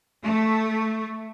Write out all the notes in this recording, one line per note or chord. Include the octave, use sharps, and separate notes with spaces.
A3